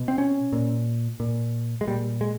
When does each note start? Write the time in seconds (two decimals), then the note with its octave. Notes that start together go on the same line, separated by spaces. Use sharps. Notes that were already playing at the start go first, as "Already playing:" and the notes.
Already playing: B2
0.08 C4
0.18 C#4
0.53 A#2
1.20 A#2
1.81 G#3
1.87 A#2 G3
2.21 G#3